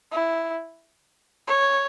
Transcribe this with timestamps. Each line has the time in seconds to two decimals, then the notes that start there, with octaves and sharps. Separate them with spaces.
0.12 E4
1.47 C#5